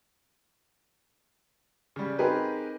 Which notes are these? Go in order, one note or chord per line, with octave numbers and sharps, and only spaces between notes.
C#3 G3
C4 D#4 G4 G#4 A#4 B4